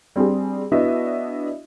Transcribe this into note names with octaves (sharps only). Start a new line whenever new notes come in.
G3 C4 D4 G4 G#4
B3 D4 E4 F#4 D#5 E5